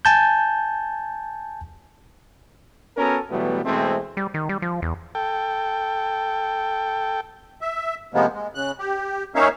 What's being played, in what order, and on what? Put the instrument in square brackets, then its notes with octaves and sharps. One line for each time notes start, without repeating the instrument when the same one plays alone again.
[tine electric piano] G#5 A5 G6
[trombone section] B3 C#4 F#4 A4 A#4
B2 E3 F#3 G3 A3 B3
B2 E3 G#3 A3 C4
[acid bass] G3
D#3
G3
F3
E2
[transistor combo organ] A4 G5
[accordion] E5
C3 F3 G#3 A#3 B3
G#3
C#3 F#6
G4
A#3 C#4 D#4 C#5 E5 F5